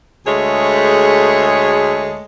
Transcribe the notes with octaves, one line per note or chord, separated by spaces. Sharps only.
D2 G#3 A3 G#4 C#5